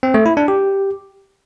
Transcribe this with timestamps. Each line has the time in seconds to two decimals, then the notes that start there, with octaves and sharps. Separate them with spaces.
0.03 C4
0.14 A3
0.26 E4
0.37 D4
0.48 G4